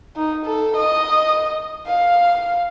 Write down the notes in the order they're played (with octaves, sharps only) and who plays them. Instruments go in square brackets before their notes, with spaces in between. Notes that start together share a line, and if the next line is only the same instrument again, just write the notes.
[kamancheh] D#4
A4
D#5
F5